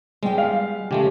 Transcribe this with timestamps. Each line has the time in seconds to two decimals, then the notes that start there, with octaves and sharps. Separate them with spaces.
0.23 G3 G#3 B3 G5
0.38 F5
0.91 C#3 G#3 A3 G4